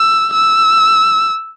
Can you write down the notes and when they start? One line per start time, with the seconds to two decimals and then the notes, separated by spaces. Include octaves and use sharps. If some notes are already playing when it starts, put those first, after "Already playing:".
Already playing: E6
0.33 E6